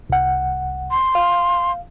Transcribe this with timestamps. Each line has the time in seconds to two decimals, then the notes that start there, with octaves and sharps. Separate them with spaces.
0.10 C2 F#5
0.91 C6
1.15 F5